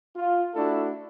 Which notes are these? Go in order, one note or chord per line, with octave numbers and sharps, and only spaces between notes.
F4
A3 D4 E4 F#4 A4